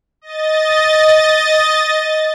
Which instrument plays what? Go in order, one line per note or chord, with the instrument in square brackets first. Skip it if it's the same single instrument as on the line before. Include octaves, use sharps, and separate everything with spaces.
[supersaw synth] D#5 A6